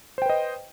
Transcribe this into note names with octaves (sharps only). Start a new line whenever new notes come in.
B4 C5 D#5 G5